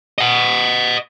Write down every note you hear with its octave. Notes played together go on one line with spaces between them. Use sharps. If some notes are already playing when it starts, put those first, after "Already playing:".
D#5 F#5